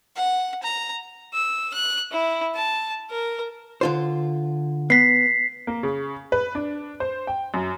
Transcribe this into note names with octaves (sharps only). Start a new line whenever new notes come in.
F#5
A#5
E6
F#6
E4
A5
A#4
D3 F4 C5
B3 B6 C7
A#3
C#3
B4
D4
C5
G5
F#2